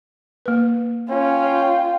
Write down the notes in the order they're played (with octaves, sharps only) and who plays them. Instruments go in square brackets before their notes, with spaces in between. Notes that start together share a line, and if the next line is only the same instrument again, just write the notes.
[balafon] A#3 B4
[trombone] C#4 [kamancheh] F4 G5